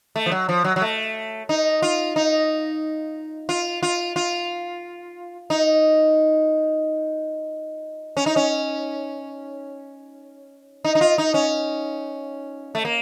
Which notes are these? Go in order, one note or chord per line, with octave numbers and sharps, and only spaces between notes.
A3
F3
F#3
F3
F#3
F#3
A3
D#4
F4
D#4
F4
F4
F4
D#4
C#4
D#4
C#4
D#4
D#4
F4
D#4
C#4
A3
A#3